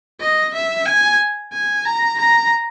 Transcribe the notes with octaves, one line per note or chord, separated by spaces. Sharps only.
D#5
E5
G#5
G#5
A#5
A#5